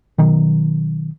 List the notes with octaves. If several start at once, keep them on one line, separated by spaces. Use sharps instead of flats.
B2 D#3 F#3